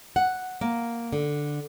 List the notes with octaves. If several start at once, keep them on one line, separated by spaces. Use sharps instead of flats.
F#5
A#3
D3